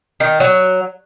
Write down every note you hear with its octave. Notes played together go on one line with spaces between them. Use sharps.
D#3
F#3